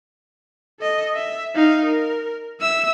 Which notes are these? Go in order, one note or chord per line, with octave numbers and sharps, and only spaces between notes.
A4 D#5
E5
D#4 F5
A#4
E5 E6